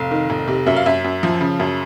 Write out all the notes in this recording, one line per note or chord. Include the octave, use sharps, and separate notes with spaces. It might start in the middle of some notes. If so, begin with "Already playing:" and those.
Already playing: F1 F5
D#3
F1
C3
F#2 E5
F5
F#2 E5
F#2
F3
C#3
F#2